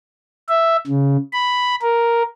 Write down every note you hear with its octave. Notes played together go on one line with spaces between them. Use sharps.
E5
C#3
B5
A#4